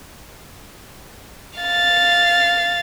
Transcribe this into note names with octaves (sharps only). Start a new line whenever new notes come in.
F5 A6